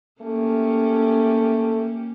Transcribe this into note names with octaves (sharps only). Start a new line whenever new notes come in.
A3 A#3 C#4 G4